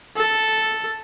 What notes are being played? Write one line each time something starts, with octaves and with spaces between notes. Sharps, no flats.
A4